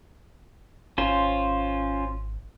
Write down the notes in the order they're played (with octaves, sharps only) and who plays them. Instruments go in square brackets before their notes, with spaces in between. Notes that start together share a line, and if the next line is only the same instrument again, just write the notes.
[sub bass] G#1 [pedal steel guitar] C#4 F4 C5